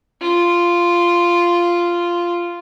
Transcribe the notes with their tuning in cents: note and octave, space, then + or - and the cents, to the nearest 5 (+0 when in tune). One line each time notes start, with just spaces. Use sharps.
F4 -10